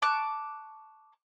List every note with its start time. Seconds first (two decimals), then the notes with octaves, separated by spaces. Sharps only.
0.02 A5 C#6 D6 F#6